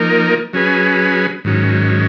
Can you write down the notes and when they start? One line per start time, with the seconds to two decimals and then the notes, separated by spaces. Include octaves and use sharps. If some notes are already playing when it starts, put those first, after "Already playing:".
Already playing: F3 A#3 D#4 A#4
0.53 F#3 C#4 G#4 B4
1.45 G#2 D#3 F#3 C#4